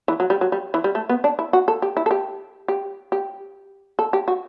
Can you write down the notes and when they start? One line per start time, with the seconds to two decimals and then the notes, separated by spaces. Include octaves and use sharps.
0.08 E3
0.20 F#3
0.30 G3
0.41 F#3
0.52 G3
0.74 E3
0.84 G3
0.95 A3
1.09 B3
1.24 D4
1.39 E4
1.53 F#4
1.68 A4
1.82 G4
1.97 E4
2.06 A4
2.11 G4
2.68 G4
3.12 G4
3.99 A4
4.13 G4
4.28 F#4